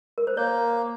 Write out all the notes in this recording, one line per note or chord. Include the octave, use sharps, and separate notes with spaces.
A#4
C5
A#3 C#5